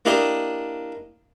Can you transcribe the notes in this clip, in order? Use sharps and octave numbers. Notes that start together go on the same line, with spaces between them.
A#3 D4 E4 G4 D#5